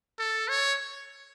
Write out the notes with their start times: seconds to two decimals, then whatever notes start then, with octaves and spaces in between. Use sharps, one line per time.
0.19 A4
0.48 C#5